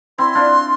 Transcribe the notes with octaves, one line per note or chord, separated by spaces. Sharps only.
C4 E4 C6
D4 F4